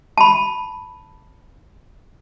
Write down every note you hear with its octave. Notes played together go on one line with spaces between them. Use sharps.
A5 B5